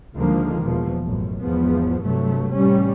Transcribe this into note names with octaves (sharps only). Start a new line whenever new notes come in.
D2 D3 D#3 F3 G#3 A#3
E2 B2 F3
A1 F#2
E2 G#2 F3 B3
G2 C3 F#3 A3
A1 G3 C#4